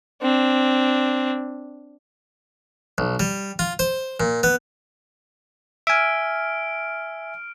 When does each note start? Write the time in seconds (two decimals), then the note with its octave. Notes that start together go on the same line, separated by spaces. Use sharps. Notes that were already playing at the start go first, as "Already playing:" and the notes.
0.22 C4 D4
2.98 B1
3.20 G3
3.59 F4
3.79 C5
4.20 A#2
4.43 B3
5.87 E5 G#5 F6 D7